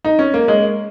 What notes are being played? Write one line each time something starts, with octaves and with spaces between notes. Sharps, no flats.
D#4
C#4
A#3
G#3